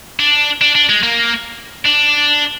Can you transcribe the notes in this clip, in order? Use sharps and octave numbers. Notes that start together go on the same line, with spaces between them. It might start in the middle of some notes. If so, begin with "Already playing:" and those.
D4
D4
D4
G#3
A#3
D4